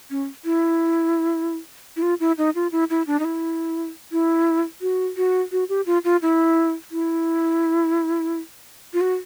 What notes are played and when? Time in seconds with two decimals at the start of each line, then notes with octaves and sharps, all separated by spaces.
0.10 C#4
0.45 E4
1.97 E4
2.02 F4
2.20 E4
2.38 D#4
2.55 F4
2.72 E4
2.90 E4
3.07 D4
3.20 D#4
3.25 E4
4.12 E4
4.81 F#4
5.17 F#4
5.52 F#4
5.69 G4
5.86 F4
6.04 F4
6.22 E4
6.91 E4
8.93 F4
9.01 F#4